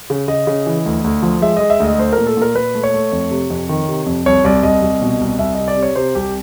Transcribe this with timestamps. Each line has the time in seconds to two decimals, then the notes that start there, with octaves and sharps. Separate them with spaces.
0.10 C#3
0.28 C#3 D#5
0.47 C#3
0.66 E3
0.86 D2
1.04 D2
1.22 F3
1.42 G#3 E5
1.57 G#3 D#5
1.70 E5
1.80 D2 D#5
1.98 A3 C5
2.13 A#4
2.18 A#2
2.27 A4
2.37 A#2 A#4
2.55 A#2 B4
2.75 A3
2.83 C#5
2.94 A3
3.12 F2
3.31 C3
3.50 F2
3.69 D#3
3.88 C3
4.06 F2
4.26 C2 C#5
4.44 C2 D5
4.63 C2 D#5
4.82 C2
5.02 B2
5.20 C2
5.39 C2 E5
5.53 C3 D#5
5.68 D5
5.77 C3
5.83 C#5
5.96 C3 C5
6.15 C2 G4